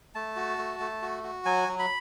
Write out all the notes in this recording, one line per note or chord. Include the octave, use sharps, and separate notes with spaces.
A3 A5
F#4
A3
A3
F#4
F#4
F#3 G#5
F#3
B5